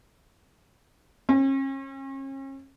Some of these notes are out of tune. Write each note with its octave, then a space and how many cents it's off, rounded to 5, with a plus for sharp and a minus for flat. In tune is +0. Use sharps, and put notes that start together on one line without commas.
C#4 -40